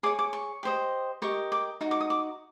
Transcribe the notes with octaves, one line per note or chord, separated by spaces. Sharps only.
G#4 C#5 D6
D6
C#6
G4 C5 D#5
G4 A#4 D#5 C#6
D6
D#4 F#4
D6
D#6
D6